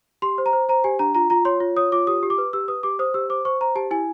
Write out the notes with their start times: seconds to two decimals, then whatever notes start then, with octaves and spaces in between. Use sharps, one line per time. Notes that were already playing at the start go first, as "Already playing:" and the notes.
0.22 G4 C6
0.38 C5
0.46 A#5
0.53 C5
0.69 C5 A#5
0.84 G4 G#5
0.99 D4 A#5
1.15 F4 A#5
1.30 F4 A#5
1.45 C#5 C6
1.60 F4
1.77 C#5 D#6
1.92 F4 D6
2.07 G4 D#6
2.23 G4
2.30 D6
2.38 B4
2.53 G4 E6
2.68 B4 D#6
2.83 G4 D6
2.99 C5 D#6
3.14 G4 E6
3.30 C5 D6
3.45 C5 C#6
3.61 C5 A#5
3.75 G4 A5
3.91 E4 G#5